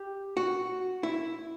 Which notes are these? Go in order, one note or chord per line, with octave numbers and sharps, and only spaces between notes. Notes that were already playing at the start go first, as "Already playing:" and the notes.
Already playing: G4
F#4
E4